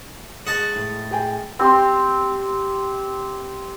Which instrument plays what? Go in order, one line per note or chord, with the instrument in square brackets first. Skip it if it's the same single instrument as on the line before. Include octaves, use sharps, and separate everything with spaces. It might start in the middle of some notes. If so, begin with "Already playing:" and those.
[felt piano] G#3 [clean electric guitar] F#4 [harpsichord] D#5 A5
[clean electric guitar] A2
[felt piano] G#4 G5 G#5
[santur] C4 G4 C6